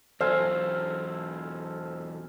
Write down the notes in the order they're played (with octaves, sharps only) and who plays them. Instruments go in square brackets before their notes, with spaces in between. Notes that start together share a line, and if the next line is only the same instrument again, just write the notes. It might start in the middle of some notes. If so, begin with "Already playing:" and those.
[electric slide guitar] E2 F#3 C#5 [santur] A4 F5 G#5 [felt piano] C5